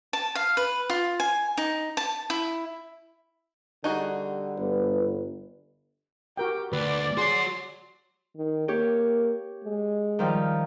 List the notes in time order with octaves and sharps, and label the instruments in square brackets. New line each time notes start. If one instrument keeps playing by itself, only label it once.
[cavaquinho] A5
F5
B4
F4
G#5
D#4
A5
E4
[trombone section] D3 G3 [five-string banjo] D#4 F#4 G#4
[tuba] G1 [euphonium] B4
[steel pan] F#4 A#4 G5 [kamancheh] G4
[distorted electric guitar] D2 [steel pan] B4 [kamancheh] D5
[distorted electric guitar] F#4 C#5 [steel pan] G#4 [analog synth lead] C6
[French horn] D#3
[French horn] A#3 [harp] G4 C#5
[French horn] G#3
[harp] D#3 F3 G3